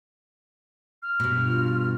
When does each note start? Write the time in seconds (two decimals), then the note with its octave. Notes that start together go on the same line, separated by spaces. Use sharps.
1.03 F6
1.20 G2 B2
1.45 F4